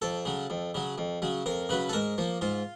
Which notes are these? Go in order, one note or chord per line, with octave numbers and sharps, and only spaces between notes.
F2 A4
C#3 F#3
F2
C#3 F#3
F2
C#3 F#3
F2 A#4
C#3 F#3 B4
A4
G#2 A#4
F3 A#3
G#2 F4